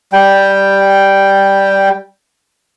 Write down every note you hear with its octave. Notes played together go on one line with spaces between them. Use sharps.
G3 G5